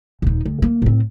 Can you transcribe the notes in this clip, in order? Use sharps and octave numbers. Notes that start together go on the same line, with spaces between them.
D#1 D#4
D2
A#3
A2 C4